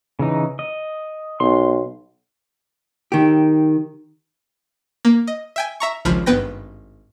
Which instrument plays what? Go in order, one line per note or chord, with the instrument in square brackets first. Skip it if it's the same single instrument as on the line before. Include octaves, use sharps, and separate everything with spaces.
[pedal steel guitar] C#3 E3 D#4
D#5
[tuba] B1 [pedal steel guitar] C6
[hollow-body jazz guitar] D#3 G4
[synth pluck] A#3
D#5
E5 G5 G#5
E5 A#5 C#6
G#1 C#2 F3 B5 F6
G#1 G2 B3 B4 G5 A#6